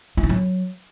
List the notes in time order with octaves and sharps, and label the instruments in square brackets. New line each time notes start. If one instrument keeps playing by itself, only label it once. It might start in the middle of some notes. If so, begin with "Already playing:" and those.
[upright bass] E4
D#4
F#3